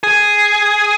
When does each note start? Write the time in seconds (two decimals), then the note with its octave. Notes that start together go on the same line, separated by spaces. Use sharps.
0.03 G#4